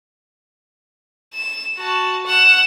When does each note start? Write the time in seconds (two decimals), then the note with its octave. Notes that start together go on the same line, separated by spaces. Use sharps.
1.34 E7
1.78 F#4 A5
2.26 F#5 E7